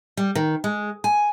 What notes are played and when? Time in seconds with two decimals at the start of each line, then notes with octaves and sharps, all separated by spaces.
0.17 G3
0.35 D#3
0.64 G#3
1.04 G#5